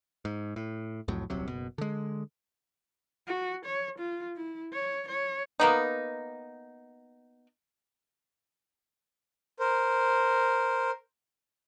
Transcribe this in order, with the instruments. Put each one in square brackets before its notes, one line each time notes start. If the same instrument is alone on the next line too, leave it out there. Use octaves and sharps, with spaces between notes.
[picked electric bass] G#2
A2
C2 F2 A2 F#3
D#1 C2 C3 F#3
F#1 B2
D3 G#3
[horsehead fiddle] F#4
C#5
F4
E4
C#5
C#5
[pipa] A#3 B3 D#4
[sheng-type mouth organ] A#4 C5